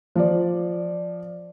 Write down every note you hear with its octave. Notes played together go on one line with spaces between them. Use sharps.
F3 D5